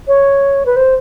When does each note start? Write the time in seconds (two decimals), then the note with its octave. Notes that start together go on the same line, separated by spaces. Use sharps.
0.08 C#5
0.66 B4
0.76 C5